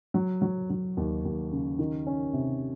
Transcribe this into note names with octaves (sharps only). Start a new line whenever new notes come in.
F#3
F#3
F#3
D#2
D#2
C#3
D#3
C#4
C3